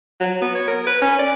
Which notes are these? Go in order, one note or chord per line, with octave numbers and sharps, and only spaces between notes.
F#3
B3
C#5
A#4
B4
C#4
D5